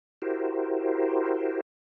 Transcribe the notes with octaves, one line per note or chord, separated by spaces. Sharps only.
E4 F#4 G4 A#4 C5